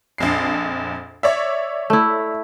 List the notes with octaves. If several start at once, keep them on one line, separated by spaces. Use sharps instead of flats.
A#1 F2 C7
C#5 D5 E5
A3 E4